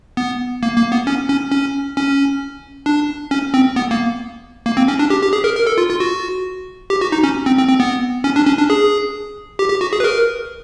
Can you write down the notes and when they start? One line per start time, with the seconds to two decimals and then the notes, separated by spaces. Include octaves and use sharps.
0.17 B3
0.63 A#3
0.77 A#3
0.92 B3
1.07 C#4
1.30 C#4
1.52 C#4
1.97 C#4
2.86 D4
3.31 C#4
3.54 C4
3.76 B3
3.91 A#3
4.66 A#3
4.77 C4
4.88 C#4
4.99 D4
5.10 G4
5.22 G4
5.33 G#4
5.44 A#4
5.56 A#4
5.67 A4
5.78 F4
5.89 F4
6.00 F#4
6.90 G4
7.01 F#4
7.12 D#4
7.23 C#4
7.46 C4
7.58 C4
7.69 C4
7.80 B3
8.24 C#4
8.36 D4
8.47 C#4
8.58 D4
8.70 G#4
9.59 G4
9.70 G4
9.81 F#4
9.93 G#4
10.00 B4
10.04 A#4